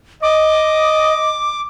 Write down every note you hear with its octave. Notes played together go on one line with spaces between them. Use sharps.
D#5 D6